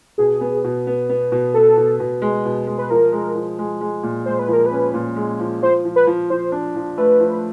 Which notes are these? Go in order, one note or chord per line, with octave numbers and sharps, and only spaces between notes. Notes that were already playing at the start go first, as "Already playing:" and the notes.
B2 G#4
B3
B2
B3
B3
B2
B3 A4
B2
B2
G#3
B2
G#3
B4
F3 A#4
G#3
F3
G#3
G#3
A#2
G#3 C5
B4
F3 A#4
B4
C#4
A#2
G#3
F3
F3 C5
F3
B4
F3
F3 C5
D4
F3
A3 B4
F3